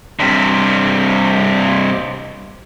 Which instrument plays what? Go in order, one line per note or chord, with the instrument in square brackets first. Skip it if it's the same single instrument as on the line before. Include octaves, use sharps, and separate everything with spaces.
[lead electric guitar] G2 C3